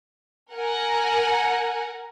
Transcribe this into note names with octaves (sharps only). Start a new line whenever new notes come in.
A#4 F#5 G#5 A#5